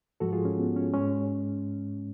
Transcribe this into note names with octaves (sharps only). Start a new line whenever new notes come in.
G#2 F3 G#3 F#4 A4
F4 G#4
C#4
B3
C#4
G#2 G#3 C#4